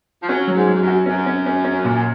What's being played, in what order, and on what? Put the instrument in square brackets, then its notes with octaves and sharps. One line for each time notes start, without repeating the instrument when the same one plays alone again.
[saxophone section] F3
[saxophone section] F#3 [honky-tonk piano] C#4
[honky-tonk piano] F#3
[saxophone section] G#2
[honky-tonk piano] F#3
[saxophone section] G#2
F#2
[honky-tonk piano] F#4
[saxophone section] F#2 [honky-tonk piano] C#4
[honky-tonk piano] C#4
C#4
C#4
A#2